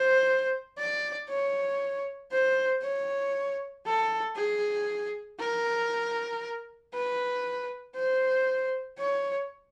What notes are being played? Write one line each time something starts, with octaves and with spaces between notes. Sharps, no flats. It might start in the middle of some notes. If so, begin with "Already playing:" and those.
Already playing: C5
D5
C#5
C5
C#5
A4
G#4
A#4
B4
C5
C#5